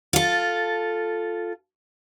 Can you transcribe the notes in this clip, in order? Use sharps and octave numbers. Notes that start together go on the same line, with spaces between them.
F4 A4